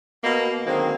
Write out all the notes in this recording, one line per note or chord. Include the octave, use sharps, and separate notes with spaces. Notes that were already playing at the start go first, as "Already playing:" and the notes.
B2 A#3
D3 D#3 F#3 G#3 A#3 C4